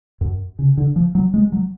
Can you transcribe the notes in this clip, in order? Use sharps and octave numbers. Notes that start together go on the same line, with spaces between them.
F#2
C#3
D3
F3
F#3
G#3
F#3